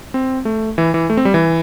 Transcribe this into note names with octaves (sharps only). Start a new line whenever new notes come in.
C4
A3
E3
E3
A3
C4
G3
E3